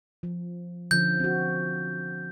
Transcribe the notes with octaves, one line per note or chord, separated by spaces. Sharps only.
F3
D3 F3 C#4 G6
C4 F#4